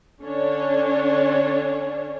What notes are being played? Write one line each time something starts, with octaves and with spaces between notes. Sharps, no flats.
D3 C#4 D4 C#5